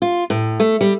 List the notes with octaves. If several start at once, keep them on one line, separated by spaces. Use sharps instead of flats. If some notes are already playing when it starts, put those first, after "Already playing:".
F4
A2
A3
G3